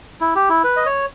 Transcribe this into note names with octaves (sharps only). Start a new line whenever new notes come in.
E4
G4
E4
B4
D#5
C#5